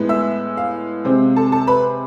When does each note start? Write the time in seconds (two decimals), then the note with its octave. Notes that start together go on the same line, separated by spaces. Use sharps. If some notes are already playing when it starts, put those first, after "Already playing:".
Already playing: A2 G#3 B3
0.09 E5 E6
0.57 F5
1.05 C3 G#3 C4
1.36 A4 A5
1.52 A4 A5
1.67 B4 B5